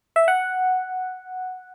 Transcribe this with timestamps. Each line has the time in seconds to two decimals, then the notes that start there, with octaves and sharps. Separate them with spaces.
0.16 E5
0.28 F#5